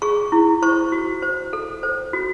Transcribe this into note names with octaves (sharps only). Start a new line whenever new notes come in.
G#4 C#6
E4
C5 C#6
F#4
C5
A4
C5
F#4